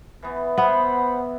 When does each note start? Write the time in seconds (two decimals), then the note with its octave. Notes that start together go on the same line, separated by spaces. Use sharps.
0.23 E3 B3
0.58 B3 C5 E5 F#5 B5